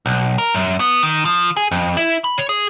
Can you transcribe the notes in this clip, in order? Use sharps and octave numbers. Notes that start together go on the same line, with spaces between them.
B1
A#4
F#2
B3
D#3
F3
G#4
F2
E4
B5
C#5
G#4